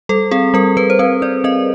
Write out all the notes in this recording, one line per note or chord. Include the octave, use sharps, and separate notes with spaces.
G3 A4
C4 G#4
G3 A#4
G3 B4
C5
C4 B4
C4 D5
C4 D#5